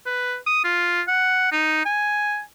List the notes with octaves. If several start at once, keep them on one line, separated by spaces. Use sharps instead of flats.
B4
D#6
F4
F#5
D#4
G#5